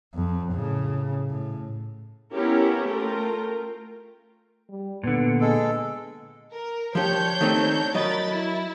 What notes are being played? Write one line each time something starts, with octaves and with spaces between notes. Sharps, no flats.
F2
A2 C#3
A2
B3 C#4 E4 G4 A#4
A3 F4 A#4 G5
G3
A#2 D3 B3
G#3 A4
A#4
F3 D4 G4 C#5 G6
D#3 A3 C4
F#3 A#4 D#5 B5 A6
E4